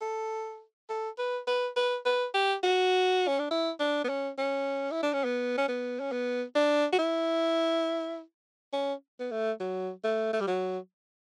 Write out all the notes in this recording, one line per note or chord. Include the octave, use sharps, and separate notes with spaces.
A4
A4
B4
B4
B4
B4
G4
F#4
C#4
D4
E4
D4
B3
C#4
C#4
E4
D4
C#4
B3
C#4
B3
C#4
B3
D4
F#4
E4
C#4
B3
A3
F#3
A3
A3
G3
F#3